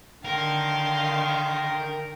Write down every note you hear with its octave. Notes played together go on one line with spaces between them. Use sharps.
D3 D#3 A#4 F5 G5 C6